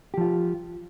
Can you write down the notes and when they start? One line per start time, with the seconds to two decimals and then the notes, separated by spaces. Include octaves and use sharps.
0.14 G4
0.17 F3
0.21 F4